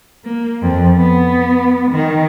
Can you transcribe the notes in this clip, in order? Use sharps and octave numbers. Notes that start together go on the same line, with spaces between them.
A#3
F2
B3
D#3